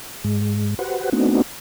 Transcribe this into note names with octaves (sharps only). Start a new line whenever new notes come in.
G#2 G#3
F#4 G4 B4 C5 F#5
A3 B3 C4 D4 D#4 F#4